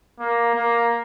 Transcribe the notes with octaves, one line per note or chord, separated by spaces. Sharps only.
A#3
A#3